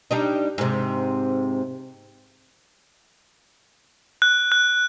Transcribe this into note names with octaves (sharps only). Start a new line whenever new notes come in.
G3 D4 D#4
G#2 C3
F#6
F#6